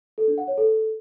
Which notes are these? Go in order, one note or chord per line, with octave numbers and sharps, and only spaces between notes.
A4
D4
F#5
C#5
A4